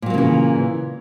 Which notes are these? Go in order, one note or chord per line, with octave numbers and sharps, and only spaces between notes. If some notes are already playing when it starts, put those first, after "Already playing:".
A#2 C#3 E3 F#3 A#3